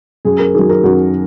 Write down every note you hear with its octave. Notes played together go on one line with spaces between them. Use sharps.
F#2 G#4
A#4
D#3 F#3 G#4
A#4
F#2 F#4